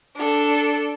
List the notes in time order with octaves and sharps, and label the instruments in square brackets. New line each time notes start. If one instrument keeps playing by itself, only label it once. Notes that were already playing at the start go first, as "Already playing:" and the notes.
[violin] D4 A4